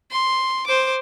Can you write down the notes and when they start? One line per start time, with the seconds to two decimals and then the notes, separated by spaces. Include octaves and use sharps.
0.11 C6
0.66 C5 D6